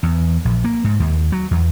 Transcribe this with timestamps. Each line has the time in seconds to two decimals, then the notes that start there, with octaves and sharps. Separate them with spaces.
0.03 E2
0.45 A#1
0.65 A#3
0.84 G#2
1.00 D#2
1.32 F#3
1.51 E2